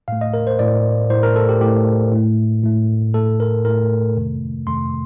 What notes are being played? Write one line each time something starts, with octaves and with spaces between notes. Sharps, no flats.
A2 A3 F5
D#5
A#4
C5
A2 A3 D5
A2 A3 C5
A#4
A4
G4
A2 A3 G4
A2 A3
A2 A3
A2 A3 A4
A#4
A2 A#4
A3
F2 C3 D#3 A3
F2 C3 D#3 A3 C6